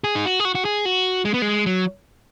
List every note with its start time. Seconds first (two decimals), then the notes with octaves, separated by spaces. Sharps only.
0.04 G#4
0.15 D#4
0.25 F#4
0.40 G#4
0.45 F#4
0.55 F#4
0.65 G#4
0.85 F#4
1.25 G#3
1.34 B3
1.42 G#3
1.66 F#3